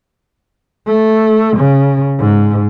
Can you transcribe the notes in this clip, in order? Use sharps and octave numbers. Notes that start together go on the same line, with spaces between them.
A3
C#3
G#2